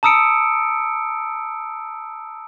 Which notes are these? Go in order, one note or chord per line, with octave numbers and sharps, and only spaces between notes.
A5 A#5 D#6 E6 C#7 D7